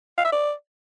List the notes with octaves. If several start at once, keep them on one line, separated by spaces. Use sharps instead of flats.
F5
E5
D5